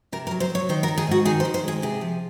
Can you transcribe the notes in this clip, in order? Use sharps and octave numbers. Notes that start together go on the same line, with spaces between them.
C3 A#4
A#4
F#3
C5
F#3
C#5
D#3 C5
A#4
D#3
G#4
G#2 F#4
D#3 G#4
C5
D#3
C5
G#3 G#4
C3 G#4
F3